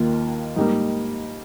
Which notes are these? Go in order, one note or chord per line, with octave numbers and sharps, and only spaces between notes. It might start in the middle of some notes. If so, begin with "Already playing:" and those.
Already playing: D#2 D#3 A#3 F4
G#2 G3 A#3 D#4